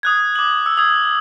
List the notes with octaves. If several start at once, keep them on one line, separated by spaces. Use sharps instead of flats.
D#6 F#6 G#6
D6 F#7
E6
D#6 G#6